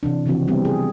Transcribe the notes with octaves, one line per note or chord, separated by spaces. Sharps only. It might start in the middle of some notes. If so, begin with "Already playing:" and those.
C3 E3 D4
C#3 E3 F3 C4 F#4
G3 B3 C4
G#4